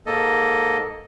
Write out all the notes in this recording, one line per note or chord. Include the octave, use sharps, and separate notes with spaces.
G#2 A#3 A4 D#5